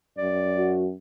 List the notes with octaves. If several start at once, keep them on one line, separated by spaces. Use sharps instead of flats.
F#2 D5
F#4